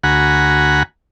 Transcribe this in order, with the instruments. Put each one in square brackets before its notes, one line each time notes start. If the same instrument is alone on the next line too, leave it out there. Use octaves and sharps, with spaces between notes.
[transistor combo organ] D2 F#4 F#5 G#5 A#5 B5